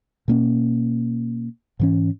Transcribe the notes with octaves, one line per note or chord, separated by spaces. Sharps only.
B2 A#3 C#4
G#2 E3 C#4